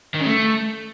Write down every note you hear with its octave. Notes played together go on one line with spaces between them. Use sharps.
D#3
C#3
A3